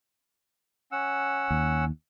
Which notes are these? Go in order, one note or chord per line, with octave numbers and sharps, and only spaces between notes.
C#4 F#5 E6
D#2